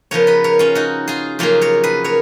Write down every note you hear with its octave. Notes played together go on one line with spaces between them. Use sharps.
C#3 F3 B3 A#4 C#5
B4 D#5
A#4 C#5
C#4 F4
D#4 F#4
F4 G#4
F2 C#3 F#3 A#3 F4 G#4
A#4 C#5
G#4 B4
A#4 C#5